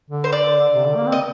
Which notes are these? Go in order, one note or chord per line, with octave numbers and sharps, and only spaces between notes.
D3
C5
D5
C3
D3
A#3
C4
D#5